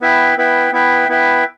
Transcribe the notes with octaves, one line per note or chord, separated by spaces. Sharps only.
B3 E4 B4 E5 G5
B3 E4 B4 E5 G5
B3 E4 B4 E5 G5
B3 E4 B4 E5 G5